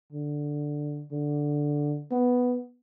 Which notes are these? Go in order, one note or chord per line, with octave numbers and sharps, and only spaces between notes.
D3
D3
B3